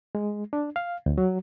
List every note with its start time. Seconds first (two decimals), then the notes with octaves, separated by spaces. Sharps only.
0.15 G#3
0.53 D4
0.76 F5
1.06 D2
1.18 F#3